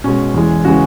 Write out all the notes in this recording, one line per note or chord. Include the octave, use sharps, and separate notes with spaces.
B2 G#3 C#4
E2 E3 G#3
C#3 E3 G#3 C#4 F#4